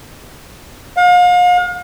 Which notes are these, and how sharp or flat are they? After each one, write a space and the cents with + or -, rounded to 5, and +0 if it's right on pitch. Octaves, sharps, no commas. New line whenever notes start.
F5 +40